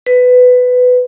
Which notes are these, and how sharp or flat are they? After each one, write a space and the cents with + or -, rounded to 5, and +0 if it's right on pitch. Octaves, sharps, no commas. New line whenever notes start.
B4 +15